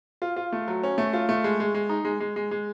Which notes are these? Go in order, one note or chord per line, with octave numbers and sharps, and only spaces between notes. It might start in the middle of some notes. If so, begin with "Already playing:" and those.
F4
F4
A3
F#3
C#4
A3
F4
A3
G#3
G#3
G#3
D#4
G#3
G#3
G#3
G#3